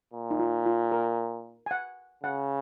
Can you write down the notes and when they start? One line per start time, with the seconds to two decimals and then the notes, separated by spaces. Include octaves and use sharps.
0.13 A#2
0.31 D#4
0.39 F4
0.66 F4
0.92 A#4
1.66 G#5
1.71 F#5
2.23 C#3 F#5